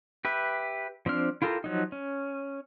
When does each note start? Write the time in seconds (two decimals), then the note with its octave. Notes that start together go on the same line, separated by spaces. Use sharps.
0.25 G4 B4 E5
1.06 F3 C4 D4 F6
1.42 E4 F4 G4 A4 A#4
1.64 F3 F#3 D#4
1.92 C#4